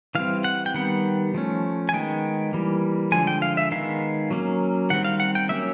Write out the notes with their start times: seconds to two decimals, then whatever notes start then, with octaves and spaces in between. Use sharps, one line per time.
0.15 E3 G3 C4 F5
0.44 F#5
0.66 G5
0.74 D#3 G3 B3 F#5
1.34 F3 A3 C#4
1.89 G#5
1.93 D#3 G#3 B3 G5
2.53 E3 G3 A#3
3.12 D3 F3 G#3 G#5
3.27 G5
3.42 F5
3.57 E5
3.72 D#3 G#3 B3 F5
4.31 F#3 A#3 C#4
4.90 D#3 G3 C4 F#5
5.05 F5
5.20 F#5
5.35 G5
5.49 F#3 A#3 C#4 E5